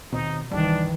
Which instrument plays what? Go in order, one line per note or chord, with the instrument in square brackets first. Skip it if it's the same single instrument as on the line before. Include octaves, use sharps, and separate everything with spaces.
[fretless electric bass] D#2 D#3 C4 [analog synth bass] B2 [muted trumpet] D#4
[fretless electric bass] C2 G2 [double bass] D#3 E3 [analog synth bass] G3 [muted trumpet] D4